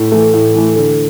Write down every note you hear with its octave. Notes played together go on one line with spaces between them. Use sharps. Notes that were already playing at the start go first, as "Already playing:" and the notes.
Already playing: A2
E3 A3
A2
E3 A3
D3